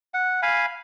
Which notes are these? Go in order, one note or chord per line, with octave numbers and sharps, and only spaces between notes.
F#5
F5 G#5 B5